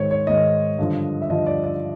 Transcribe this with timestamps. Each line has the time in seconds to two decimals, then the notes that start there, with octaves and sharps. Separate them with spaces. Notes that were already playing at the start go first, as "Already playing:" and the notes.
Already playing: G#2 D#3 C5 C#5
0.11 C#5
0.27 G#2 D#3 D#5
0.78 G2 D3 F3
1.22 E5
1.30 G2 D3 F3 D#5
1.47 D5
1.64 D5